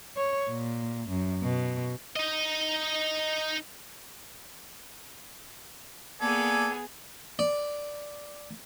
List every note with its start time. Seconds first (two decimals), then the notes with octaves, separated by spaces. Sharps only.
0.17 C#5
0.50 A#2
1.09 F#2
1.43 B2
2.16 D#4 D#5
6.21 A#3 B3 G#4 A4 D5 G#5
7.39 D5